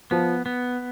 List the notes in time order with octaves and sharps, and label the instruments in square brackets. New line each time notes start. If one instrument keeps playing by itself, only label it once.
[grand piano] F3 [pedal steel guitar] B3
[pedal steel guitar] B3